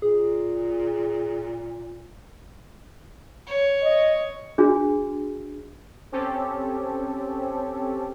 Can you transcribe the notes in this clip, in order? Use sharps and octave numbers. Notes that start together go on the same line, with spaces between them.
A#2 G#4
C#5
D#5
D4 F#4 G#4
C4 C#4 G4 A4